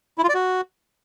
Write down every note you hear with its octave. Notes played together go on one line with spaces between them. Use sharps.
E4
F4
D5
F#4